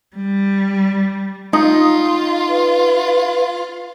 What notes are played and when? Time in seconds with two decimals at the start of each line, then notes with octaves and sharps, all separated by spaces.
0.15 G3
1.53 D#4 F4
2.49 B4